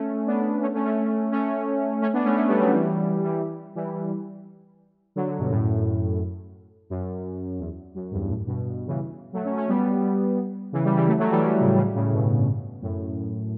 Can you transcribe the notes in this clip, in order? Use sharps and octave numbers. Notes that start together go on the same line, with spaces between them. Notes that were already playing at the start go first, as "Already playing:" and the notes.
Already playing: A3 C#4
B3 D4
A3 C#4
A3 C#4
A3 C#4
A3 C#4
A3 C#4
B3 D4
A3 C#4
A3 C#4
G3 B3
F#3 A3
E3 G3
E3 G3
E3 G3
D3 F#3
G2 B2
F#2 A2
F#2
E2
F#2
E2 G2
F#2 A2
G2 B2
C#3 E3
F#3 A3
A3 C#4
A3 C#4
G3 B3
C#3 E3
E3 G3
E3 G3
F#3 A3
F#3 A3
E3 G3
F#3 A3
A2 C#3
A2 C#3
A2 C#3
G2 B2
F#2 A2